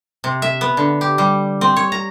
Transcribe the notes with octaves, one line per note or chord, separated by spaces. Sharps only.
C3
E5
B3
D3
G4
G3
C4
C#5
A#5